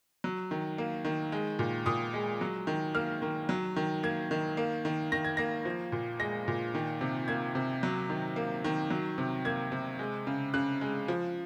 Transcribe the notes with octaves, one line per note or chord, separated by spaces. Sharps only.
F#3
D#3
A#3
D#3
G#3
A#2
A#2 D#6
G#3
F#3
D#3
A#3 F6
D#3
F#3
D#3
A#3 G#6
D#3
A#3
D#3
D#3 A#6
G#6
A#3 A#6
F3
A#2
G#3 A#6
A#2
D#3
C3
A#3 G#6
C3
F#3
D#3
A#3
D#3
F#3
C3
A#3 G#6
C3
G#3
C#3
C#3 F#6
G#3
F3